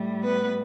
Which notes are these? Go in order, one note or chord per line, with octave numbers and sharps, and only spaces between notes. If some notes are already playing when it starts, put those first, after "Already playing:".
Already playing: A2 G3
B3 B4